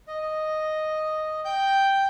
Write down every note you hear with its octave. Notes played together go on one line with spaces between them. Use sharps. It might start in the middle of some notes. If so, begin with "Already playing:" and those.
D#5
G5 G6